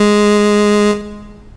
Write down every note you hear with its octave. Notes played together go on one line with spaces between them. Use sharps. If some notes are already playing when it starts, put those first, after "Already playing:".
Already playing: G#3